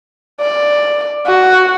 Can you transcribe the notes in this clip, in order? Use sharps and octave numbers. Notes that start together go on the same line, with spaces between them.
D5
F#4